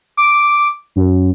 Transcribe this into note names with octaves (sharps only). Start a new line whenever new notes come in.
D6
F#2